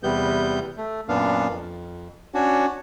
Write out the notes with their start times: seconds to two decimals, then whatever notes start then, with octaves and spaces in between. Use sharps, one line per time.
0.03 E2 C3 G3 B3 G6
0.77 A3
1.09 F#2 A#2 B3 D4 F5
1.50 F2
2.34 C#4 D4 F#4